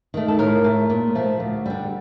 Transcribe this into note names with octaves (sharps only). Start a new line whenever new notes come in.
D#3 A3
A4
A2 A#4
A3
A#2
F3 A3
D2
D3 G3